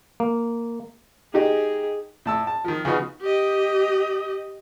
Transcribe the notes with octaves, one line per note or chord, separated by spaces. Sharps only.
A#3
D#4 G4 G#4 D#5
A2 A5 E6
A5
D#3 F3
C#3 F3 B3 D#4 F#4
G4 D#5